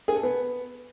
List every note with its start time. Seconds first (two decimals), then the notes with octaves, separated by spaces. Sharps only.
0.08 G#4
0.16 A4
0.23 B3